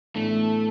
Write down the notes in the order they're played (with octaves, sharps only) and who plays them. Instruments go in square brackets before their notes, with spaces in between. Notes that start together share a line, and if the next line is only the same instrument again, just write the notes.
[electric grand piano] A2 E3 B3 D4 [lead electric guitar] A3